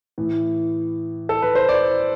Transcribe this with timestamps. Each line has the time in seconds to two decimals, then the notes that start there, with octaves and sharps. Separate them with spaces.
0.18 A2 E3
1.29 A4
1.42 B4
1.55 C5
1.69 D5